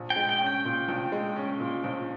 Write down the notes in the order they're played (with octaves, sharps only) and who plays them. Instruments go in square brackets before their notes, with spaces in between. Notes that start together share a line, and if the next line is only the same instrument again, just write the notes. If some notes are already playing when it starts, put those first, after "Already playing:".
Already playing: [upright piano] A#1
[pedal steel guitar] G5
[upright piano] G#3
[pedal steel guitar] G5
[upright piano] C#4
[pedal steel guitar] G5
[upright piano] A#2
A#1
G#3
C#4
A#2
A#1